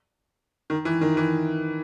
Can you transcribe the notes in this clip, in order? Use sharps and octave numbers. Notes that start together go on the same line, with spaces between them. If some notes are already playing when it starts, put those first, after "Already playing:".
D#3
E3
D#3
E3